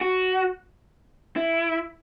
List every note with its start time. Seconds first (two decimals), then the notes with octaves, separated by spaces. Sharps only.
0.01 F#4
1.36 E4